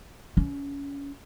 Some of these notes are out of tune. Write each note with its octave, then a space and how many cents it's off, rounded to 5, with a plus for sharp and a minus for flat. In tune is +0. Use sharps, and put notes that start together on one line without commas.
C#4 +25